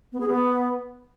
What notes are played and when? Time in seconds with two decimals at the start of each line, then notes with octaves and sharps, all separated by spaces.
0.12 B3
0.20 G#4
0.28 B3